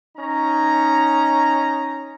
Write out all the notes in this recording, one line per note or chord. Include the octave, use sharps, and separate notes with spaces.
C#4 D#4 A#5